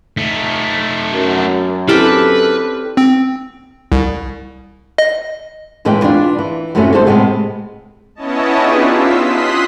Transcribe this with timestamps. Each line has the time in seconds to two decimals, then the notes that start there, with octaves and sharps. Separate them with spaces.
0.17 A3 D#4 B6
1.12 F#2
1.88 C4 D4 E4 G4 A4 B4 F6
2.97 C4
3.92 C2
4.98 D#5
5.85 D#2 A2 E3 G#3 G5
6.03 E3 D4 F4
6.39 E3
6.75 F#2 A2 C3 F#3 A3 C#4
6.93 D3 G3 A4 C5
7.06 A2 C3 F3 G#3 B3
8.15 B3 C#4 E4 C#5 D#5 A5
8.58 D4 D#4 F4 G4 G#4 B4
8.89 F4 E6 B6
9.25 C6 D#6 F#6 B6